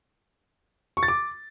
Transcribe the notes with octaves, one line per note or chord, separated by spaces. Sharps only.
C#6
A6
D6